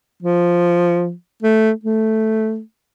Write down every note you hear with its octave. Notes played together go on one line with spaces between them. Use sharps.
F3
A3
A3